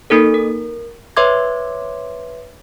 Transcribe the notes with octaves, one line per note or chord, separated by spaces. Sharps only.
A#3 D#4 A4 A#4
A#4
B4 C#5 E5 C6 D6 G#6